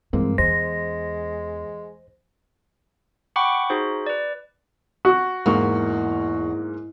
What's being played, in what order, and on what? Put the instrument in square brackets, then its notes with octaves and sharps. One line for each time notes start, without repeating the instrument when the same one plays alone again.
[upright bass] G2 [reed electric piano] E3 G#3 C4 [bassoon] A#3
[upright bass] E2 [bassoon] G#3 [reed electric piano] C5 [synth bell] A#6
[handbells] F#5 G5 B5 C#6 D6
D#4 F#4 G#4 C5
B4 D5
[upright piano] F#4
[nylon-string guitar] E2 [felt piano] G#2 A#3 C#6